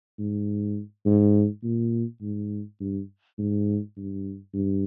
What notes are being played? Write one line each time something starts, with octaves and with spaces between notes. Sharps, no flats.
G#2
G#2
A#2
G#2
G2
G#2
G2
G2